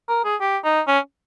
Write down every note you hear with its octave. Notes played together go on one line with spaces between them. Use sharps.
A#4
G#4
G4
D#4
C#4